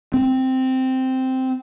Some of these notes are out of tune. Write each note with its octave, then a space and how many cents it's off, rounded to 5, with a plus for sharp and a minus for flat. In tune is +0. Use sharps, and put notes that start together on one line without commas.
C4 -5